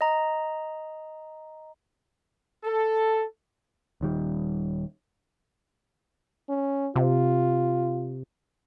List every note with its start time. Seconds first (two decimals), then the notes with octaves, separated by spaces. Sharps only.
0.01 D#5 A#5
2.65 A4
4.01 D#1 D#3 G3
6.49 C#4
6.96 C3 F4